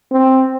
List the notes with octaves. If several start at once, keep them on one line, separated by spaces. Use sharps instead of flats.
C4